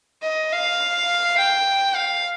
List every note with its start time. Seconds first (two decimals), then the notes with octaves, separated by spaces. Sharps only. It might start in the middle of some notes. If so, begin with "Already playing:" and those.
0.23 D#5
0.52 F5
1.38 G5
1.95 F5